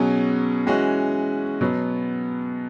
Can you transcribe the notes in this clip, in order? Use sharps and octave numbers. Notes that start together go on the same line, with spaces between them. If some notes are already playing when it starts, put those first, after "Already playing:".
Already playing: B2 F#3 C#4 G#4
E3 G#3 C#4 F#4
B2 F#3 B3